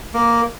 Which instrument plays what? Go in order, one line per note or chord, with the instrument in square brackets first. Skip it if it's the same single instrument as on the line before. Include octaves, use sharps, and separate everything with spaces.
[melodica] A#3